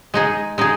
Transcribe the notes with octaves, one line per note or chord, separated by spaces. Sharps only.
G#3 D#4 G#4
G#3 D#4 G#4